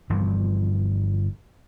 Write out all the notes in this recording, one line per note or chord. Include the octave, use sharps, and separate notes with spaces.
G1 G2 E3 F3